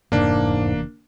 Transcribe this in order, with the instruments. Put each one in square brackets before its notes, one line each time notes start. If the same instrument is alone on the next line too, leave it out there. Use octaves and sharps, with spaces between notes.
[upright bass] F1 E2 [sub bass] G#2 [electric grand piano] A#3 D4